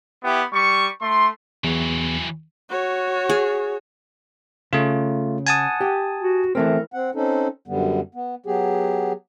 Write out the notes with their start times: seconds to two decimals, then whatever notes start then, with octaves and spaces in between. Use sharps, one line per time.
0.24 B3 E4 G4
0.53 G3 C#6
1.01 A3 C6
1.64 E2 E3 F#3
2.70 F#4 C#5
3.30 G#4
4.73 C#3 A3 F4
5.47 F#5 G#5 A5 D#6
5.81 G4
6.21 F#4
6.55 E3 A3 C4 A#4
6.93 C4 F#5
7.15 C4 C#4 D#4 A4
7.68 F#2 D3 G3 B3
8.15 B3
8.46 F#3 B3 G4 G#4